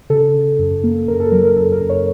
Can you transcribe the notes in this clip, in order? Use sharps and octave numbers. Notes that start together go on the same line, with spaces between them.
C#3 A4
C#3
F#2
A#3
F#2 A#4
A4
F#3 A#4
A#4
F#2 A4
A#4
F#2
C#5